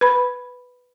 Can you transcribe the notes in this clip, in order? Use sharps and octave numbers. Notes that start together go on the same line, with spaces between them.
B4 B5